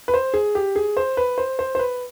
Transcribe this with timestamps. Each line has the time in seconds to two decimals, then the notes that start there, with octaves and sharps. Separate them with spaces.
0.08 B4
0.14 C5
0.34 G#4
0.55 G4
0.76 G#4
0.97 C5
1.17 B4
1.38 C5
1.59 C5
1.75 C5
1.79 B4